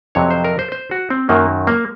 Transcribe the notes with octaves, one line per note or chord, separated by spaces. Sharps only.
F2 C3 F#3 C#5
C5
A#4
C5
C5
F#4
C4
F#2 D#3 F#3 A#3
A#3